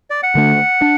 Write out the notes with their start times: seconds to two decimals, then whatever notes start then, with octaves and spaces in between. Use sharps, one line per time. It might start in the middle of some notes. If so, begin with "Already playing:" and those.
0.10 D5
0.23 F#5
0.35 D3 A3 D4
0.82 D4